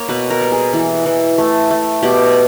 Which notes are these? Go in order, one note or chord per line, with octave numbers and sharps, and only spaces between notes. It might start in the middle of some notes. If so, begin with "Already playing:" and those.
Already playing: A#3 C#5
B2 B4
A#4
G3
G#4
E3
E3
A3
A3
B2 G4